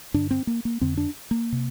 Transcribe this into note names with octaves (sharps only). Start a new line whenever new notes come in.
G2 D3 D4
C4
A#3
A#3
F2 D3 C4
D4
A#3
C3